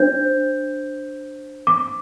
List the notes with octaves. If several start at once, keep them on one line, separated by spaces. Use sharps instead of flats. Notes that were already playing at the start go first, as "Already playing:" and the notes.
Already playing: D4 C5 G6
D6